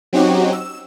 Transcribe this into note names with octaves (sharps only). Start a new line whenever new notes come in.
F#3 C4 C#4 D#4 F#4 G4
E6